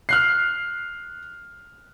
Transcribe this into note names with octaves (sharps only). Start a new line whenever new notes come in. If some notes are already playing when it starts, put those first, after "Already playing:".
F6 F#6 C7